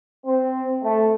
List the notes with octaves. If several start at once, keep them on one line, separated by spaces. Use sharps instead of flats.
C4
A3